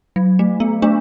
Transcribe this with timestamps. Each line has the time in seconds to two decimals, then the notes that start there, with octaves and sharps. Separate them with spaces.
0.16 F#3
0.39 A3
0.60 B3
0.82 A3 D4